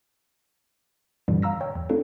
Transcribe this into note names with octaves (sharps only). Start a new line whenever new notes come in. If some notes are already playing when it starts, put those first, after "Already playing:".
G2 A#2 D3 E3 G3
F5 A#5 E6 A#6
C#5 G5
E2
A3 C4 D4 E4 F4 A4